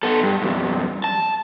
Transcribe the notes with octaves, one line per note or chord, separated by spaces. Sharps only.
B3 A4
G2
E2 G2
A5